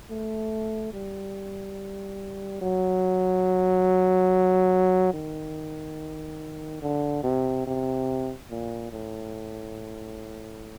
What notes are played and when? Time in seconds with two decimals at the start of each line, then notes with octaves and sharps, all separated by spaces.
0.11 A3
0.94 G3
2.62 F#3
5.13 D#3
6.82 D3
7.23 C3
7.66 C3
8.50 A#2
8.92 A2